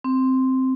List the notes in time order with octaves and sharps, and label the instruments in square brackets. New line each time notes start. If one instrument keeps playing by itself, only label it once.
[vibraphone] C4